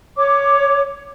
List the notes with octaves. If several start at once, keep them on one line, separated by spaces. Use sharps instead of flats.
C#5 D6